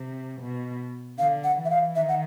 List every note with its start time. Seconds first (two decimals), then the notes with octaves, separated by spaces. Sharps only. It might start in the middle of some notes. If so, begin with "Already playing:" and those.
Already playing: C3
0.41 B2
1.19 D3 F5
1.44 F#5
1.58 E3
1.65 E5
1.70 F5
1.96 D#3 E5
2.09 F#5